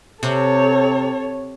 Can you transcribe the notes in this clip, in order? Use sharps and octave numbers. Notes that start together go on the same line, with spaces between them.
C3 A4 C#5